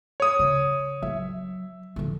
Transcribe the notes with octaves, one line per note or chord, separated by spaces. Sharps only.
C#5 D#6
C#3
F#3 E5
D3 F3